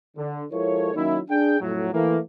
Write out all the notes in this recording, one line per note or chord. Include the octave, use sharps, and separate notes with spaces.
D3
F3 G#3 E4 A4 A#4 C#5
D#3 F#3 A#3 C#4 D#4 E4
D4 G#4 G5
F2 A2 F#3
E3 A3 A#3